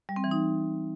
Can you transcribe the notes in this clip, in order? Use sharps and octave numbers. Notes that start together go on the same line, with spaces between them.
G3
C4
E3
D#4